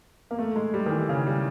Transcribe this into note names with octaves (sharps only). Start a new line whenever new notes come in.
A#3
A3
G#3
G3
D#3
E3
C#3
G3